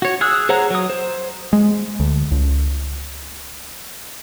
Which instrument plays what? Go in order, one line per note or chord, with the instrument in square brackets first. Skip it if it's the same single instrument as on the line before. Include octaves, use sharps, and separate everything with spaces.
[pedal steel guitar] F#4 C#5
G#4 D#6 E6 F#6
G#4 C5 C#5 F#5 A#5
F#3 D#6
C5
[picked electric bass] G#3
D2
C#2